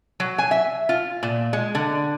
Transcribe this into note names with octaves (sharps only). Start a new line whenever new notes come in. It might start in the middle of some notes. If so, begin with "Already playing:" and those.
F#3
G#5
E5
F4
A#2
G#3
D3